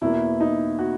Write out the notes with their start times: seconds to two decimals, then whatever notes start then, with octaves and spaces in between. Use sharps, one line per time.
0.01 E2 B2 A#3 E4
0.40 D#4
0.79 F#4